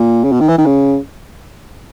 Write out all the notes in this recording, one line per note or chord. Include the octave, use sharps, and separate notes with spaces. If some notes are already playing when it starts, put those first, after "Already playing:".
Already playing: A#2
C#3
B2
D#3
E3
D#3
C#3